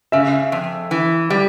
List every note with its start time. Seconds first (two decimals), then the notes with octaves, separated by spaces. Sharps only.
0.12 C#3 E5
0.52 F2
0.91 E3
1.30 G3